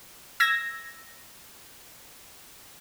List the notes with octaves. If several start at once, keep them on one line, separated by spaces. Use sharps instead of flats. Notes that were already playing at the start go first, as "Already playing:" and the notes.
E6 G#6 A#6